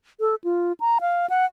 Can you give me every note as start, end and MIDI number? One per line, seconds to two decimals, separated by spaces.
0.20 0.35 69
0.44 0.72 65
0.80 0.99 82
1.01 1.26 77
1.30 1.45 78